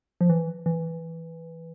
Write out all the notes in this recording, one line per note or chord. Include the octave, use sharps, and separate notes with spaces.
F3
E3
E3